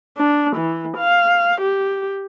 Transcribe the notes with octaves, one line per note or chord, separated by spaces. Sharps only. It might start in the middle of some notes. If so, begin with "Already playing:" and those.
D4
E3
F5
G4